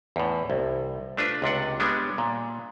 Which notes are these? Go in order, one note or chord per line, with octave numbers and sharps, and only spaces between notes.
E2 A2
C2
A3 D4 F4 B4
C#2 C3 D4 F#5
G3 G#3 B3 D4
A#2